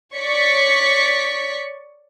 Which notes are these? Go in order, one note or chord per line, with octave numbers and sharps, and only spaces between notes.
C#5 D5 C#6 B6